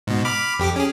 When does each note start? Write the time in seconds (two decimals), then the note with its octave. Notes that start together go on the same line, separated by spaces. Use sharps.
0.07 G#2 B2
0.25 B5 D6 F6
0.59 F2 G4 D6
0.76 C#4 G#4